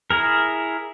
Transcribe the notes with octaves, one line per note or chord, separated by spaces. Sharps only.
E4 G#4 A#4